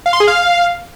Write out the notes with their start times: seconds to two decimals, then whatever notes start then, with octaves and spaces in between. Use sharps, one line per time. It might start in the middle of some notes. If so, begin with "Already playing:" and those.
0.06 F5
0.13 C6
0.20 G#4
0.27 F5